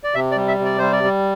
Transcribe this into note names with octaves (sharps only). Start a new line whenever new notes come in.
D5
C3 E5
D5
G3
E5
C3
D5
G3 C5
D5
G3